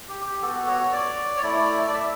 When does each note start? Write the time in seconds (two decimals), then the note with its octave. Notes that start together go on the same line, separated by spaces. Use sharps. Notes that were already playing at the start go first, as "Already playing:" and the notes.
0.09 G4
0.25 G4
0.42 B3 F#4 A4
0.67 C#5
0.92 D5
1.37 C#5
1.43 A3 E4 D5
1.87 D5
1.93 E5